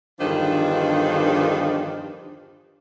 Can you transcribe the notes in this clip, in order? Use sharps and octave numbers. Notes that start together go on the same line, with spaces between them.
E2 G2 D3 D#3 F3 D4